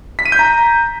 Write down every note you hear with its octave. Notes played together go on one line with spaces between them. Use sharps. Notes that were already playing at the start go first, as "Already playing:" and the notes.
B6
D#7
G6
A#5